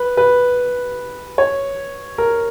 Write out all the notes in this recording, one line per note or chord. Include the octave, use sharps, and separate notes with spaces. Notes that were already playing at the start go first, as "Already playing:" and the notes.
Already playing: B4
B4
C#5
A#4